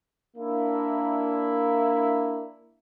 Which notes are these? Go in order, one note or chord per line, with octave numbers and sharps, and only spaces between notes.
A#3 D4 E4